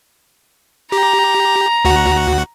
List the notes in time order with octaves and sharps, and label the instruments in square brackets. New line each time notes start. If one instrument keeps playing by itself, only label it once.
[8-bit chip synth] G4 [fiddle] A#5
[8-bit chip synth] D2 F#4 F#5